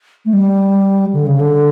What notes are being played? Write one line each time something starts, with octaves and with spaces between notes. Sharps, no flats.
A3
G3
D3
C#3
D3